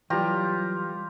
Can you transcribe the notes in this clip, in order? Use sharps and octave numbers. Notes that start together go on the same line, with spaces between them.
E3 F#3 G3 F4 G4 A#5